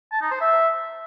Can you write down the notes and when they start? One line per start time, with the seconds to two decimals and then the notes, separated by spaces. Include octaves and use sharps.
0.12 A5
0.22 D#4
0.31 C5
0.41 E5